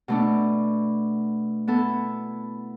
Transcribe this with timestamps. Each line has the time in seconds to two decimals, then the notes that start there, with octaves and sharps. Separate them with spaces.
0.08 B2 A3 D4
1.68 B3 E4 A4